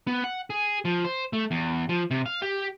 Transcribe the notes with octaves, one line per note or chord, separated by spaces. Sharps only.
B3
F#5
G#4
F3
C5
A3
E2
F3
C3
F5
G4